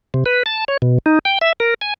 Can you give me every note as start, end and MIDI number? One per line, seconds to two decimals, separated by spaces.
0.14 0.24 48
0.26 0.43 71
0.46 0.64 81
0.68 0.77 73
0.82 0.98 47
1.06 1.19 63
1.25 1.38 79
1.41 1.53 76
1.60 1.74 70
1.81 1.94 80